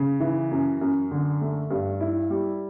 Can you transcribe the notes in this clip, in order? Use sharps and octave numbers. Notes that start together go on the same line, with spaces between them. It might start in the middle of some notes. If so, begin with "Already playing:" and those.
Already playing: C#3
E3
F#2
F#2
D3
A3
G2
E4
G3